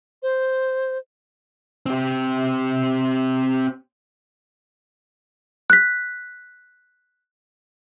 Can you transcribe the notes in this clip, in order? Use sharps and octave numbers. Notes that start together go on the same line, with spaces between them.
C5
C4 G4
F#6 B6